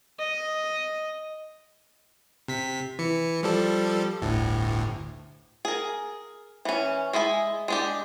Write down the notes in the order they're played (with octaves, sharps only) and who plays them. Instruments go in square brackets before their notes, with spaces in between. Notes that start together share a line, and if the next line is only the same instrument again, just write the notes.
[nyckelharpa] D#5
[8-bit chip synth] C3 B6
E3 C#7
F3 G3 A4
G1 D2 A2
[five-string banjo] G#4 A#4
E3 C#4
G#3 E4 D#5 G#5
G#3 D4 G4